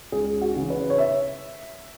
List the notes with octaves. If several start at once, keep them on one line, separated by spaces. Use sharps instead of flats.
C#2 G#4
F#4
C#3 E3
B4
C#5
E5